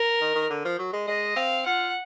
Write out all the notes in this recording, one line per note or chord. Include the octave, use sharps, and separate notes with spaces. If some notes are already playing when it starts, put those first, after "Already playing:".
Already playing: A#4
D#3
D#3
D3
F3
F#3
G#3
G#3 D#5
C4 F5
F4 F#5